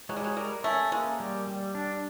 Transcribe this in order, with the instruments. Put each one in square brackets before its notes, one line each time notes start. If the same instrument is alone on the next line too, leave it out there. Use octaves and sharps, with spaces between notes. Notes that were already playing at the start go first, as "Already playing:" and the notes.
[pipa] F#3 [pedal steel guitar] G#3
[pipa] G3
F#3
[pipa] G3 [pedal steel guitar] A#4
[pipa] A3 [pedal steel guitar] C#4
[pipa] G#3 [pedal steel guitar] A#3
[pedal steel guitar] G3
G3
D4